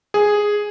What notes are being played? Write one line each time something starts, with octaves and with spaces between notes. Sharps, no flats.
G#4